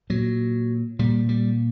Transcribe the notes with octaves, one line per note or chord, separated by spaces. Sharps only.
A#2 F#3
A#2 G3
G3